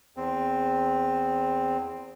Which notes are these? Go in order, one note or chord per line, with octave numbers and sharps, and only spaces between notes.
E2 C4